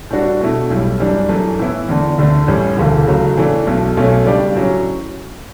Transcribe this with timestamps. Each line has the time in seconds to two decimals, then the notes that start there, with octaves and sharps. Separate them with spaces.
0.10 A2 G3 D4 F#4
0.41 B2 A3 E4
0.70 B1 A2 G3
1.00 F#2 E3 G3 D4
1.29 F#2 E3 A3
1.59 A2 E3 B3 E4
1.89 E2 D3 A3
2.18 D2 D3 A3 D4
2.48 A1 A2 G3 C#4
2.77 E1 D2 C#3 E3 A3
3.07 C#2 C#3 F#3 A3
3.37 A2 E3 A3 D4
3.67 B1 B2 A3
3.97 B1 B2 A3 C#4
4.25 C#3 G3 D4 G4 D5
4.55 A2 F#3 C#4